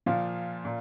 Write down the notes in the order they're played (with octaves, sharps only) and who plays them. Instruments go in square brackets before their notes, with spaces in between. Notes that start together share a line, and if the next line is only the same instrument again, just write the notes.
[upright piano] A#2 F3 F4
A#2